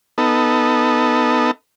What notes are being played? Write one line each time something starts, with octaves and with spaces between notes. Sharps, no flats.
B3 D#4 A4